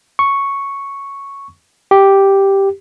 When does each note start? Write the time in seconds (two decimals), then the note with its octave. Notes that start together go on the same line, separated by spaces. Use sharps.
0.19 C#6
1.91 G4